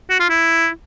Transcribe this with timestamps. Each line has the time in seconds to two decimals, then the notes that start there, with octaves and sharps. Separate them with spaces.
0.10 F#4
0.20 F4
0.29 E4